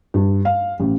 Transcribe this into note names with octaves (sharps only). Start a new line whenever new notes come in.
G2
F5
A1